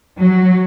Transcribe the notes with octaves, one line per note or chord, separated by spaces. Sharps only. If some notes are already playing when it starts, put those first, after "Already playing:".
F#3